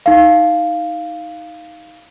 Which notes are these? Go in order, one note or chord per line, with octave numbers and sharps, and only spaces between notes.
D#4 F5